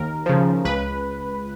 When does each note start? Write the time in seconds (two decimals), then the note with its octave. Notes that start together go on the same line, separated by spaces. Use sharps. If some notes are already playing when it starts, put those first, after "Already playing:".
Already playing: D#2 A#4
0.26 C#3 F3
0.65 C#2 B4